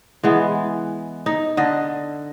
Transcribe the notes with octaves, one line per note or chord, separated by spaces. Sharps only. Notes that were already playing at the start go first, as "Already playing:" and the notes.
E3 G#3 B3
D#4
D3 D#5